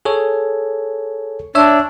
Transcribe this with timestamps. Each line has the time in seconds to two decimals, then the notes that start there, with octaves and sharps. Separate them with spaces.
0.05 G#4 A4 C#5
1.55 D4 C#5 E5 E6